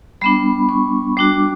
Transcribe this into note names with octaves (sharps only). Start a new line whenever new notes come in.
G3 B3 D4 B5
C#6
G3 D4 F#4 D6